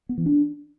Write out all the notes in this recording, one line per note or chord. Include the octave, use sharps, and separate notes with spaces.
B3
E3
D4